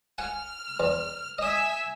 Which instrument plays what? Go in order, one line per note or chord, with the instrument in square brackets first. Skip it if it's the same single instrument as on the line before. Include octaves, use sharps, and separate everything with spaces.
[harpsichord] F#5 G#5 [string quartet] F6
[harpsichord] E2
[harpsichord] D#5 D#6 [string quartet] E5 G#5 E6